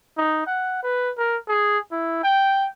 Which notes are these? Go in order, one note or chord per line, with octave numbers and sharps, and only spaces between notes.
D#4
F#5
B4
A#4
G#4
E4
G5